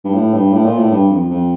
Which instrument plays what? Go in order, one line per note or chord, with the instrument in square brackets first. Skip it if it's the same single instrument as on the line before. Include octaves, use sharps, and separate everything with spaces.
[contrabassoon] G2
A2
G2
A2
A#2
A2
G2
F2
F2